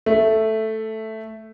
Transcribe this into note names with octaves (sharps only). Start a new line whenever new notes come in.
A3